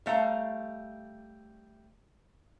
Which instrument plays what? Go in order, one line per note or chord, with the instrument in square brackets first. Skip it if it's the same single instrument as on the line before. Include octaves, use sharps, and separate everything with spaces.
[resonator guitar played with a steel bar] G3 A3 F5 A#5